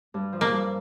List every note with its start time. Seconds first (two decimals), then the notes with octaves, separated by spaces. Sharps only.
0.14 G2
0.33 F3
0.41 A#3
0.52 G2